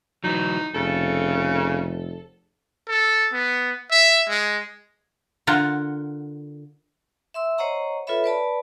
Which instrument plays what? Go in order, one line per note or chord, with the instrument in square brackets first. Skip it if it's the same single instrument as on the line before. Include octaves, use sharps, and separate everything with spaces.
[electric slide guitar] E3 F#3 [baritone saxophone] D#4
[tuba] F1 [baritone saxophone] C#3 [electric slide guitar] A4
[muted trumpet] A4
B3
E5
G#3
[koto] D3 F4 A#4 F#5
[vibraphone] E5 C6 E6
C5 C#5 D#5 F#5 A#5 C#6
F4 A4 B4 C#5 E5 B5
B4 D5 A5 B5